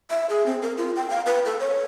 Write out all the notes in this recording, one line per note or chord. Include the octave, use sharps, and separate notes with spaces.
E5
G#4
C4
A#4
F4
G5
F5
B4
A4
C#5